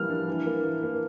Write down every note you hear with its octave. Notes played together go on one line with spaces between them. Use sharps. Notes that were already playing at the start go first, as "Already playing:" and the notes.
Already playing: E3 F3 G3 A#3 F6
D4
E3
A#3
E3
A#3